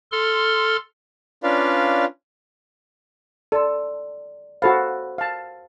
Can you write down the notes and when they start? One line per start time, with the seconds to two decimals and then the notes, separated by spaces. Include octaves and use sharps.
0.12 A4 C6 F6
1.44 C#4 D4 F4 B4 D5 F5
3.52 A4 D5 C6
4.62 F#4 A4 C5 F5 B5 A6
5.18 F5 A5